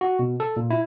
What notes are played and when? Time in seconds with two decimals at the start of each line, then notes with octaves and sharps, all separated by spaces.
0.01 F#4
0.19 B2
0.40 A4
0.56 A#2
0.70 E4